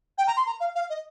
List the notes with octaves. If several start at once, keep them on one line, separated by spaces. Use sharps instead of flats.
G5
A#5
C6
A#5
F5
F5
D#5